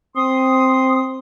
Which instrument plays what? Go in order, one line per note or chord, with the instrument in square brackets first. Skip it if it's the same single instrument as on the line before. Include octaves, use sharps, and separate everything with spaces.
[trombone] C4 [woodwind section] C6 D#6